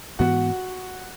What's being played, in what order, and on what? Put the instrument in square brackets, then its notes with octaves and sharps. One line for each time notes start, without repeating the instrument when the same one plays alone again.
[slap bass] G#2 E3 B3 [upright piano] F#4 F#5